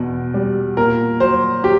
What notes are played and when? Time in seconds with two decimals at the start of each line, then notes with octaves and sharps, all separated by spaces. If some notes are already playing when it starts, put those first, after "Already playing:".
Already playing: E2 B2
0.34 G3
0.77 A#2 A#4
1.20 F#3 C5
1.63 F#3 G4